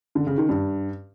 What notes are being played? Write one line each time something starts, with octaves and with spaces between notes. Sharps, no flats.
D3
C#3
D#3
G2